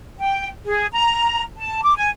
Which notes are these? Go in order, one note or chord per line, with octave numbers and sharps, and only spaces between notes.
G5
G#4
A#5
A5
D6
G#5